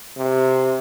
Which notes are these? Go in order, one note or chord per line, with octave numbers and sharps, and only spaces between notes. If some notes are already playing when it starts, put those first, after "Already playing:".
C3